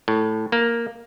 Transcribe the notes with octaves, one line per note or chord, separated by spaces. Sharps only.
A2
A#3